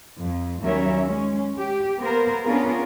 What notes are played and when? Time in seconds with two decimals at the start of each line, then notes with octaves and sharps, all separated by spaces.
0.21 F2
0.63 D#2 F#3 G3 C#4 A#4 E5
1.06 G#3 C#4
1.59 G4
1.99 A#3 B3 A#4 C5
2.44 B3 C#4 D4 F4 G#4 A#4